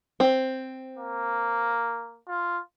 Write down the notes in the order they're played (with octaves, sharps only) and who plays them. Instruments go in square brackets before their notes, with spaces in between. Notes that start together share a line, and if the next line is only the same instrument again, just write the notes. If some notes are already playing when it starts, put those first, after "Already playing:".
[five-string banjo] C4
[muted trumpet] A#3
F4